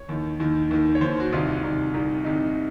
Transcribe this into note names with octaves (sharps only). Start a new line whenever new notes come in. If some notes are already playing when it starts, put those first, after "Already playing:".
Already playing: C#5
D#2 D#3
D#2 D#3
D#2 D#3
C#5
D#2 D#3 C5
F#4
C2 C3 D#3 F4
C2 C3 D#3
C2 C3 D#3
C2 C3 D#3 D#4